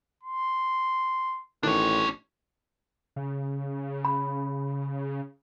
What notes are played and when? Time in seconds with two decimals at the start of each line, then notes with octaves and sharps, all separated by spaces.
0.24 C6
1.63 A1 D#3 D4 C#5
3.16 C#3
4.05 B5